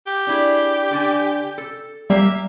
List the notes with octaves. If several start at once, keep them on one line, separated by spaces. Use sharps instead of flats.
G4
D4 E4 G#4
D3 D4 G#5
A4
G3 A#3 G4 E5 F5